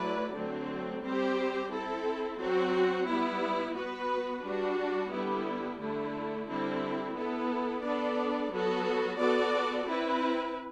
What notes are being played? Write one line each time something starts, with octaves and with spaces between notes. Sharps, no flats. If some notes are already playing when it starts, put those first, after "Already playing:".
Already playing: F#3 A3 E4 B4 D5
D3 F#3 A3 C4
G3 C4 G4 C5
C4 E4 A4
F#3 C4 F#4
G3 B3 E4
B3 F#4 B4
G3 D4 F#4
D3 G3 B3 E4 G4
D3 A3 E4
D3 G3 C4 E4
B3 E4 A4
B3 D4 A4 D5
F#3 B3 F#4 A4
B3 F#4 A4 D5
C4 E4 B4